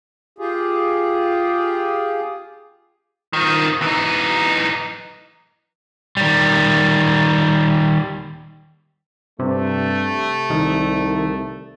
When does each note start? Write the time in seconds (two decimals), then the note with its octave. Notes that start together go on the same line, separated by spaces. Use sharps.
0.39 F4 G4 G#4
3.33 D#3 F3
3.82 E3 D#4
6.17 D#3 G3
9.39 G2 C3 A3
10.50 C2 D#3